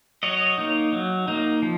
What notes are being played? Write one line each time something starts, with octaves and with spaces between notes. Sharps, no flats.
F#3 C#5 D#5
A#3 D#4
F#3
A#3 D#4
F3